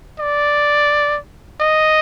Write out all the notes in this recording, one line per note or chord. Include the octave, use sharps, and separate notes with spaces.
D5
D#5